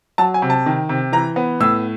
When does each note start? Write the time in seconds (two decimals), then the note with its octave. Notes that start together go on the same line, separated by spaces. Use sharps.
0.18 F#3 A5
0.34 G#5
0.42 C3
0.50 A5
0.66 D#3
0.89 C3
1.12 E3 A#5
1.36 B3
1.60 A2 E6